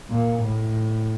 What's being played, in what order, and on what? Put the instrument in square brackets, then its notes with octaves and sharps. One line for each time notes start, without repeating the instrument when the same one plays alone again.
[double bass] A#2
A2